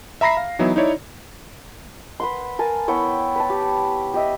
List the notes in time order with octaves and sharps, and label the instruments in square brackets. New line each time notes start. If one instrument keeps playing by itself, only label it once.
[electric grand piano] E5 A#5 B5 A#6 C7
F5
E3 F#3 B3 D#4 E4
D#4 E4 C#5 D5
[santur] B4 F#5 C6
A#4 G#5 A5
B3 E4 C#5 G5
B4 A5
G4
G4 D#5 E5